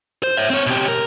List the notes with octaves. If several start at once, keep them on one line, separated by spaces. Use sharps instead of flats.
C5
C#5 E5
C4 C#5
B2 G4
A#4